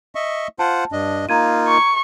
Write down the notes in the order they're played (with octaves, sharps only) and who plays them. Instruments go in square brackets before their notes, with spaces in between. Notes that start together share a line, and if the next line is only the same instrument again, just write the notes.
[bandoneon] D#5 E5 C#6
[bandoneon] F4 C5 F#5 [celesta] A5
[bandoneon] G2 D4 D#5
[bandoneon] A#3 D#4 F4 [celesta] A#5 G#6 D#7
[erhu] C#6